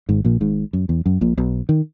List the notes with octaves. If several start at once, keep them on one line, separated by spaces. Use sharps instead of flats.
G#1 G#2
A#1 A#2
G#1 G#2
F#2
E2
F#2
A#1 A#2
B1 B2
D#3